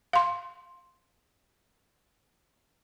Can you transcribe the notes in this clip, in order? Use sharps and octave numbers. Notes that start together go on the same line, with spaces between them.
F5 C6